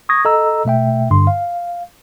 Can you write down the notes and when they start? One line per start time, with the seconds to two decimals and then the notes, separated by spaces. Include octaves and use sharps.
0.09 C#6 D#6 G#6 A#6
0.25 A4 D#5 A#5 E6
0.65 B2 A3 E5 G5
1.11 G2 D3 C6
1.27 F5